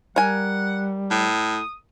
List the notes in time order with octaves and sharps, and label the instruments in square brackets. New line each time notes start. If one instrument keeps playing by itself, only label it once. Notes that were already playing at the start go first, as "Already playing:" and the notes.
[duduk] G3 [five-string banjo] A#4 G#5 [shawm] F#5
[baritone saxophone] A2 [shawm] D#6